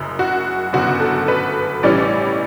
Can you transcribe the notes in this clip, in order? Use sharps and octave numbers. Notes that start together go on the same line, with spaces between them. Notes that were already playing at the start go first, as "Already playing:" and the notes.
Already playing: F#1 F#2 C#3
F#4
G1 F#2 C#3 F#4
A4
B4
A1 A2 E3 G3 C#4 D5